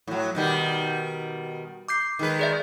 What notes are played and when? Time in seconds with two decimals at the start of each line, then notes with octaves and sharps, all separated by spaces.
0.07 A2 F#3
0.35 B2 D#3 G3
1.88 D6 G6 C7
2.19 D#3 G#3 B4
2.39 G#4 D5 E5